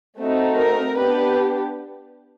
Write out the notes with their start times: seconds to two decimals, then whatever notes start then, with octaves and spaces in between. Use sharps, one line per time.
0.18 A3 C4 D#4 F#4
0.57 A#4
0.96 B3 D4 G4 B4